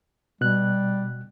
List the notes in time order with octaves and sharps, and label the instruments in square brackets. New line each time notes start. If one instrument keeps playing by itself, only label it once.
[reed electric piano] B2 F#6 [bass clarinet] G3